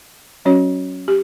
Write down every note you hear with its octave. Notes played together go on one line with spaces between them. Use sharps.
F#3 C#4 F#4 C#5
G4